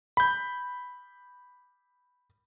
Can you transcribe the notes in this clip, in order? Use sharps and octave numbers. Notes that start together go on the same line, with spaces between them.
B5 G6